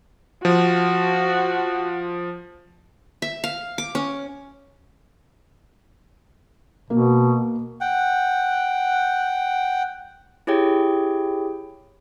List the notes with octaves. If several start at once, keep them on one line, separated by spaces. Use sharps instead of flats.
F3 F#4
E5
F5
D6
C#4
B2 A#3
F#5 G5
E4 G4 G#4 C#5 G5